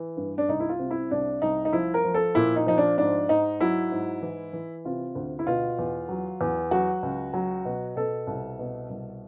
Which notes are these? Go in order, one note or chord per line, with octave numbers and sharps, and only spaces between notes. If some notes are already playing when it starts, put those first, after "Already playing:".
Already playing: E3
G2
D4
C2 D#4
E4
F4
C3
E4
C2 D4
C2 D#4
D#4
F3 E4
A#4
F3
A4
A#2 E4
D#4
F3 D#4
D4
G#2 D4
G#2 D#4
F#3 E4
G#2
E3
E3
C3 F4
D2
E4
B2 F4
E2
F#3
E2
F#3 F#4
C#2
F#3
B2
B2 A4
C2
B2
C2